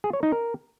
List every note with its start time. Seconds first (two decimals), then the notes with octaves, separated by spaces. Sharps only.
0.04 G#4
0.13 C#5
0.23 D#4
0.32 A#4